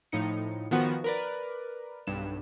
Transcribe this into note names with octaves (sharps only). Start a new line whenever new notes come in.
A2 F3 D#4 C#7
D#3 F3 B3 F#4
A#4 B4 D5
B1 G2 E7